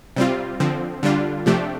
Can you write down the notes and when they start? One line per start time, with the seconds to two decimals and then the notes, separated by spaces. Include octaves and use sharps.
0.16 C3 G3 C4 F4
0.60 D3 F3 C4
1.03 D3 G3 D4 F4
1.46 C3 F3 A3 D4 G4